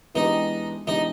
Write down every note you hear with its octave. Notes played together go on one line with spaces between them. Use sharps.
E3 G#3 B3 D4 D#4 G4
E3 G#3 B3 D4 D#4 G4